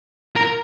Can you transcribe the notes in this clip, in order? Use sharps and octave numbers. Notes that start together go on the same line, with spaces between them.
A#4